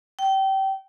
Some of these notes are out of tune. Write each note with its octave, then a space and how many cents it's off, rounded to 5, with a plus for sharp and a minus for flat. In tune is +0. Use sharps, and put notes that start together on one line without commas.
G5 -25